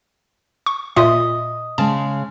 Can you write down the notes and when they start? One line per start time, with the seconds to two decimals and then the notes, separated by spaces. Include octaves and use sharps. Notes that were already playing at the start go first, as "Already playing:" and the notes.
0.66 C#6
0.96 A#2 F4 D#5 E5
1.78 C#3 G#3 A5